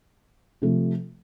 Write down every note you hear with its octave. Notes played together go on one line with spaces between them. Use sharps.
C3 F3 A3